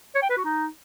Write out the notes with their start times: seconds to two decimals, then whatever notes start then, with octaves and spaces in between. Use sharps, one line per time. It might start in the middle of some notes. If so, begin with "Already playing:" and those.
0.15 C#5
0.22 G5
0.30 B4
0.37 F#4
0.44 D#4